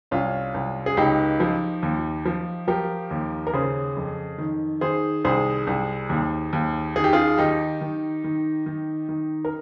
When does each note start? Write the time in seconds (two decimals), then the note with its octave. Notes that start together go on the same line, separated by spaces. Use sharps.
0.11 C2 C#4 F4
0.54 C2
0.86 G#4
0.97 C#2 D#4 G4
1.40 F3
1.83 D#2
2.25 F3
2.68 F3 G4 A#4
3.11 D#2
3.47 A#4
3.54 C#3 G#4 C5
3.97 F2
4.38 D#3
4.81 D#3 G#4 C5
5.24 C2 G#4 C5
5.67 C2
6.09 D#2
6.53 D#2
6.95 D#3 G#4
7.04 G4
7.13 F4 G#4
7.38 D#3 D#4 G4
7.81 D#3
8.24 D#3
8.66 D#3
9.09 D#3
9.45 A#4